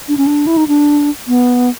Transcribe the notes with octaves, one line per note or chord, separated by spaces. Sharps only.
D4
C#4
D4
E4
D#4
D4
B3